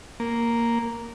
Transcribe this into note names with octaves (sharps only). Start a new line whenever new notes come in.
A#3